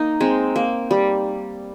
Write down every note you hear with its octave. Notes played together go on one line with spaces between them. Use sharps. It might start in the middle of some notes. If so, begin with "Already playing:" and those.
Already playing: A#3 D#4
G#3 C4
A#3
G3